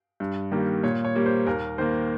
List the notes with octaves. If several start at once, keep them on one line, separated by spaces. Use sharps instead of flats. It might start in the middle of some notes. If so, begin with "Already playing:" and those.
G2
D#3 G3 A#3
A#2 C#5
C#5
G3 A#3
C5
D#2 A#4
D#3 A#3 C5